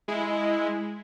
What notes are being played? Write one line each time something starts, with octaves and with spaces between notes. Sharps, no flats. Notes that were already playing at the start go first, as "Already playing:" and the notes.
G#3 E4